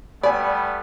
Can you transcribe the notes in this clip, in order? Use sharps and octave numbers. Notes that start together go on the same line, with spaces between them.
G3 A3 B3 D5 G#5 B5